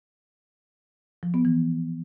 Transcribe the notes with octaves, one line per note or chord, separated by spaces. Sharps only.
F3
B3
E3